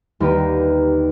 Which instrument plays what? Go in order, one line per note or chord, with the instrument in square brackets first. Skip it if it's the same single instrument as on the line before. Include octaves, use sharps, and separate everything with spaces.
[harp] D#2 D3 A#3 G4 B4